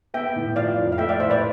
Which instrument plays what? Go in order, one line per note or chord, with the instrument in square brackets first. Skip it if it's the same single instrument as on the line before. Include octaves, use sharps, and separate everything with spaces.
[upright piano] B3 [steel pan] E5 G5
[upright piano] A2
[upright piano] F3 [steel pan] D5 F5
[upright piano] F2
[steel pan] F5
[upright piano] A3 [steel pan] E5 G5
[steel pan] D5 F5
[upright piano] A2 [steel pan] C5 E5
[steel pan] B4 D5